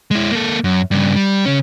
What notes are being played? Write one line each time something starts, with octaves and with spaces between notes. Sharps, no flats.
G#3 E4
A#3 A4
F#2
G2 C#3
G3
C#3 C#4